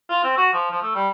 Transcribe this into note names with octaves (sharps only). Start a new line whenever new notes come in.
F4
C4
F#4
F3
F3
A3
G3